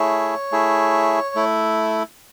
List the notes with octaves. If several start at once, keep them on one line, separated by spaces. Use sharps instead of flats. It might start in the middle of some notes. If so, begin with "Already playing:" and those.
Already playing: A3 E4 G#4 C#5
A3 E4 G#4
A3 E4